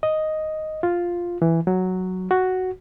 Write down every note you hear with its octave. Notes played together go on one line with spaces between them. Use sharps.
D#5
F4
E3
F#3
F#4